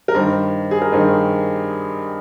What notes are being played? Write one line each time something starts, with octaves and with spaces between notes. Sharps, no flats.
A#4
G2 D#3 C5
G#4
A#4
G2 D#3 C5